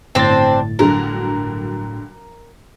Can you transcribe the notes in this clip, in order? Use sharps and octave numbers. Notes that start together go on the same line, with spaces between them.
G1 A2 C4 D4 C5 A6
G2 D3 F#3 A#4